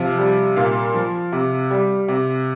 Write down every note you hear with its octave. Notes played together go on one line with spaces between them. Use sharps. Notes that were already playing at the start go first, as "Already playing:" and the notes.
Already playing: C3 F3 F5
G3
A#2 F5
F3
C3
G3
C3